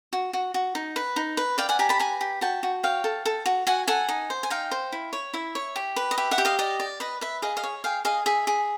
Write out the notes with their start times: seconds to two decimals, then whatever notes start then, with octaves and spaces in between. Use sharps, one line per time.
0.13 F#4
0.33 F#4
0.54 F#4
0.75 D#4
0.96 B4
1.16 D#4
1.37 B4
1.58 D5 F5 G5
1.69 F#5 G#5
1.79 G4 G#5 A#5
1.89 A5 B5
1.99 B4 G#5 A#5
2.21 G4
2.41 F#4 G5 A5
2.63 F#4
2.83 C#5 F5 G5
3.04 A4
3.25 A4
3.46 F#4
3.67 F#4 F#5 G#5
3.87 A4 F#5 G#5
4.09 D#4
4.30 C5
4.43 G#5
4.50 D#4 F5 G5
4.71 C5
4.92 E4
5.13 C#5
5.34 E4 E5
5.55 C#5
5.76 G4
5.96 B4
6.11 D#5
6.18 G4 E5
6.31 E5 F#5
6.38 G4
6.45 D#5 F5
6.59 D5 D#5
6.80 D5
7.00 B4 D#5
7.21 B4 E5
7.42 G#4 D#5 F5
7.57 D#5 F5
7.63 C#5
7.84 G#4 F5 G5
8.05 G#4 D#5 F5
8.26 G#4 E5
8.47 G#4